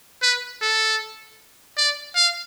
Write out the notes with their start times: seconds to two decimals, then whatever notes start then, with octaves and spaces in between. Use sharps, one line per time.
0.22 B4
0.62 A4
1.77 D5
2.16 F5